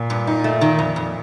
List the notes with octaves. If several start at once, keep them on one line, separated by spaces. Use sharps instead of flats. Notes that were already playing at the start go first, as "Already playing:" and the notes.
Already playing: A#2
G2
D#4
A3
D#3
F2
F2